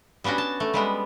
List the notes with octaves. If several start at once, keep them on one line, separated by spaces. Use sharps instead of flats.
G3 B3 C#4 D4 F#4
A5
A3
G3 G#3 B3